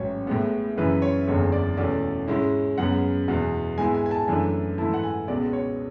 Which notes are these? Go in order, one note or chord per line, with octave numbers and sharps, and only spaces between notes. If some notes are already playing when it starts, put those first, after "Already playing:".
Already playing: A1 G#2 F#3 C#4 C#5
A2 G#3 B3
F#2 C#3 E3 B4
C#5
F#1 E2 D3 G#3 C#5
D5
E2 B2 A3 C#4 D5
G#2 G#3 C#4 E4
F#2 C#3 G#3 B3 F#5
E2 B2 G#3 B3
G#2 G#3 B3 E4 G#5
G#5
G#5
A5
F#2 E3 A3 D4 G#5
G#2 E3 A3 E4 A5
F#5
G#5
C#2 B2 G#3 B3 D5
C#5